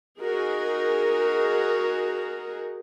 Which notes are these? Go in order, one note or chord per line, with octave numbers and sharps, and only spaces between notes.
D#4 F#4 G#4 A#4